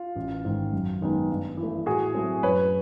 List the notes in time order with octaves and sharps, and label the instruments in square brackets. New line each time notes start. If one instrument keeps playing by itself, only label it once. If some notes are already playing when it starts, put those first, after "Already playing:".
Already playing: [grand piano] F4
A1
G#2 D#3
F#2
D#3 G#3 B3 D#4
G2
E3
A3
A2 F#4 G#4
F#3 A3 C4
F#2 B4 C#5